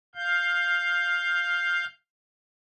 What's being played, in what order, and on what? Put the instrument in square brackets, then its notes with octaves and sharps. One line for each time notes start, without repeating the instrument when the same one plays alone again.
[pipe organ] F5 G6